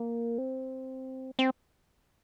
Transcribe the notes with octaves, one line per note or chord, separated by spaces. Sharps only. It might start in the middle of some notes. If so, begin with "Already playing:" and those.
Already playing: A#3
C4
C4